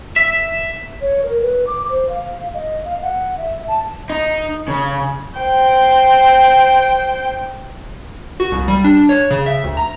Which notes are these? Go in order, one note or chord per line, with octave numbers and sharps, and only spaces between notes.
E5
C#5
A#4
B4
D6
C5
F5
D#5
F5
F#5
E5
A5
D#4
C#3
C5 G5
F#4
C2
G3
D4
D4
C#5
C#3
E5
D2
A#5